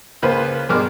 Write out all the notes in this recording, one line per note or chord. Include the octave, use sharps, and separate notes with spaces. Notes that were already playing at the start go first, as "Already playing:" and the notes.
C#2 A#3 F4 B4 C5 B5
G2 B2 G#3 A#4 D6 F6